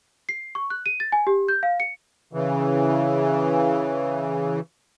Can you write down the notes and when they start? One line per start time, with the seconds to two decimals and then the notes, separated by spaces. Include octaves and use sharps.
0.29 C7
0.55 C#6
0.70 F#6
0.86 D#7
1.00 A6
1.12 G#5
1.27 G4
1.48 G6
1.63 F5
1.80 C#7
2.33 C#3 E3